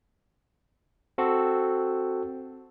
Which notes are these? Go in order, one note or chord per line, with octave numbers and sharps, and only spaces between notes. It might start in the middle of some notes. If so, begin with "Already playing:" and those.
C4 F#4 A4